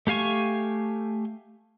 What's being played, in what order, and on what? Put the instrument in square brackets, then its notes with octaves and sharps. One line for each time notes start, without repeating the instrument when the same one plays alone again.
[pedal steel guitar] A3 G4 F5 G#5 C#6